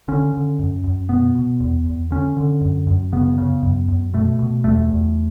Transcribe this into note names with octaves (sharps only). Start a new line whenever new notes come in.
D3 C#4
D3
F#2
F#2
B2 B3
B2
E2
E2
D3 C#4
D3
F#2
F#2
C#3 B3
C#3
F#2
F#2
B2 A3
B2
E2 A3
E2